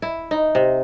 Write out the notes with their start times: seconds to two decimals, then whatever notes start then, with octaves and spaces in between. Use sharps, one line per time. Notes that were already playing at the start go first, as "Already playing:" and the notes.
0.02 E4
0.31 D#4
0.55 C3